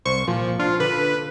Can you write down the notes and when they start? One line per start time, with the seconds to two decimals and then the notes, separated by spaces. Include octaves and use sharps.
0.05 C2 C5 C#6
0.28 A#2 F3
0.60 D4 F4
0.80 D3 B4